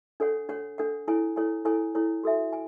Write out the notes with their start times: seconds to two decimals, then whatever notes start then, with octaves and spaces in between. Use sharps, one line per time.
0.20 D4 A4 C#5 F#5
0.49 D4 A4 C#5 F#5
0.78 D4 A4 C#5 F#5
1.07 E4 A4 C#5 G#5
1.36 E4 A4 C#5 G#5
1.65 E4 A4 C#5 G#5
1.95 E4 A4 C#5 G#5
2.23 F#4 A4 E5 G#5
2.53 G#5